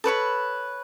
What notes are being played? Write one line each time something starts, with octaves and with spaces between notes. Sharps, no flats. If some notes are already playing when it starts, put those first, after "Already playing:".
A4 B4 C#5 B5